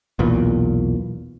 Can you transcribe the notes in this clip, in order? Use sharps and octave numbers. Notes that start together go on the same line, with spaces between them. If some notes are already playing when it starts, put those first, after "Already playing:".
B1 E2 A#2